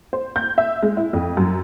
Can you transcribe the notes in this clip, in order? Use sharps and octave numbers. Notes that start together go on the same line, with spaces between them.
C5
G6
E5
G#3
E4
F2
F#2